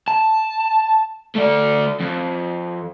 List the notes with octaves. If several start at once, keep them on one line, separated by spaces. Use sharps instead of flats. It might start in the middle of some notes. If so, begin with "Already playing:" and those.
A5
A3 D5
F2